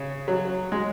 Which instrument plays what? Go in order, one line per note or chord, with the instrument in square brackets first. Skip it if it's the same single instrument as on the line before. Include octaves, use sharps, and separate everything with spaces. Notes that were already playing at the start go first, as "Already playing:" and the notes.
Already playing: [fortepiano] C#3
F#3
G#3